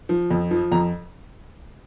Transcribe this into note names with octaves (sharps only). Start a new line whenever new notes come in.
F3
F2
F3
F2 A#5